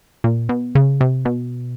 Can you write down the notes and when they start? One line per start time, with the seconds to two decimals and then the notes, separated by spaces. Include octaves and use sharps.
0.24 A#2
0.49 B2
0.75 C#3
1.01 C3
1.25 B2